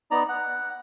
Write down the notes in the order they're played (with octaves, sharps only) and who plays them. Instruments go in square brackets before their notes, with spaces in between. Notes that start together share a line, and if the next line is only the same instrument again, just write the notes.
[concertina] B3 D#4 D5 A#5
F#5